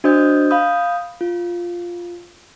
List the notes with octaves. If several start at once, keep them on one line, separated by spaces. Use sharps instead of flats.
D4 F#4 C5 D#5 D#6 G6
F5 B5 D#6 G6
F4